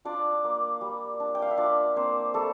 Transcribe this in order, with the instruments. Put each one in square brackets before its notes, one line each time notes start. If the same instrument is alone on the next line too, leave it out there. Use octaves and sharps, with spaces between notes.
[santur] D4 F4 D5
A#3
G3
D4
G5
F5
E5
D4 F4 D5
A#3 C4 C5
G3 A3 A4